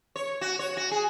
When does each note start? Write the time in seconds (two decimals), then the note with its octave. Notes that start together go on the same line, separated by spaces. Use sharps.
0.16 C#5
0.41 F#4
0.59 C#5
0.77 F#4
0.91 G#4